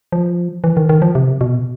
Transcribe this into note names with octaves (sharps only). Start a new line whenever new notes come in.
F3
E3
D#3
D#3
F3
C3
B2